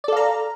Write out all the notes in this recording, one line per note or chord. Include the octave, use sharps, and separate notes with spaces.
A4 D5 F5 A#5